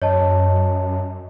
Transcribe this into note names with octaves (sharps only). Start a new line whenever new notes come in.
F#2 C#5 D#5 A5